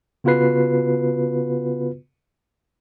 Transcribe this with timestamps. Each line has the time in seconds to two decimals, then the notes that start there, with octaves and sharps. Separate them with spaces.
0.24 C#3 B3 F4 F#4 B4 C7